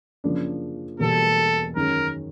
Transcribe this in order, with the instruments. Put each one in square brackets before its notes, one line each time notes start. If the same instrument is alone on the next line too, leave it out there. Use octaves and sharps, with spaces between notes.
[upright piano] F#2 C#3 F3 A#3 D4
[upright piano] E1 E2 B2 G3 A#3 [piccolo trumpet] A4
[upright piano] F#2 D#3 G#3 C#4 [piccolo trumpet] A#4